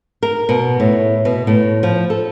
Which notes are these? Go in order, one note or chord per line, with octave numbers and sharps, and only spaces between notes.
A#4
B2
A2
B2
A2
F3
A4